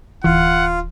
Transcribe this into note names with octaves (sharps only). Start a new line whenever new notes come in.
D1 E3 F4 F#5